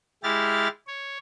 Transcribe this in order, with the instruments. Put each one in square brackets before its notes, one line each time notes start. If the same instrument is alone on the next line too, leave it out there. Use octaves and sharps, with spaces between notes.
[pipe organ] G#3 E4 G4 F6 A6
C#5